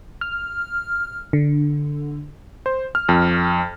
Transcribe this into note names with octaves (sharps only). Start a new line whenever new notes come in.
F6
D3
C5
F6
F2